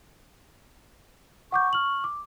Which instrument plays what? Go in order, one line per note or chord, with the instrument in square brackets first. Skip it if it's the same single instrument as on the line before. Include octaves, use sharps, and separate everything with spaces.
[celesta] F#5 D6 G6 [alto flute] C#6
[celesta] F6 F#7
D6